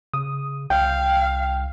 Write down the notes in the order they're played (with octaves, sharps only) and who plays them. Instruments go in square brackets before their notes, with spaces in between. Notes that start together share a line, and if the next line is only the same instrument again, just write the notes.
[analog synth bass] C#3 [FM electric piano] D#6
[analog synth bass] C2 [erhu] F5 [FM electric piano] G5